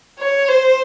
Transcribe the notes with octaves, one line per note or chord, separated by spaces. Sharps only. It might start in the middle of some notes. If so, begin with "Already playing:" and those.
C#5
C5